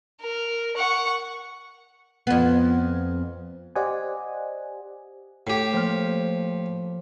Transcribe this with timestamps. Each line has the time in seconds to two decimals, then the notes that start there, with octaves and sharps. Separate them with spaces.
0.21 A#4
0.77 F#5 C#6
2.27 F2 B3
3.75 G4 C5 D5 D#5 F#5 G#5
5.47 A2 G4
5.73 F3 A#3 F6